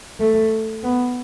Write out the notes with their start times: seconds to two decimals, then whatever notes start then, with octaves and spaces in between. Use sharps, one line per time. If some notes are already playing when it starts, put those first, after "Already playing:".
0.20 A3
0.83 B3